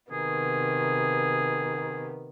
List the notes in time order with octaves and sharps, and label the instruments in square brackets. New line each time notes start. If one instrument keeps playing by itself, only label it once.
[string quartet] C3 D#3 B3 [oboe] G#4